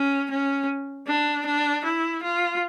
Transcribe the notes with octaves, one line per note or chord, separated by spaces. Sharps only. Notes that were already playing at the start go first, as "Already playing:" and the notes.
Already playing: C#4
C#4
D4
D4
E4
F4